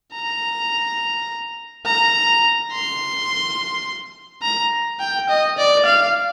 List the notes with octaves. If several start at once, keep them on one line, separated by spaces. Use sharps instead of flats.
A#5
A#5
C6
A#5
G5
D#5
D5
F5